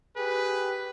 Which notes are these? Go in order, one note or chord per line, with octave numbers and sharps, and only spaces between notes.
G4 G#4 B4